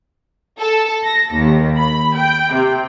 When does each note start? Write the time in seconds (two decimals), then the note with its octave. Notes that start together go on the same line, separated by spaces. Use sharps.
0.60 A4
1.04 A#6
1.34 D#2
1.77 B5
2.16 G5
2.53 C3